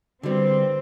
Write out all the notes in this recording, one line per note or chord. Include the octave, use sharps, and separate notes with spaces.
D3 G3 C4 F#4 B4